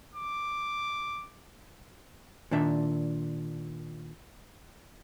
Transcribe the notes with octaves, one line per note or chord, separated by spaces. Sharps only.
D6
A#2 D#3 D4 E5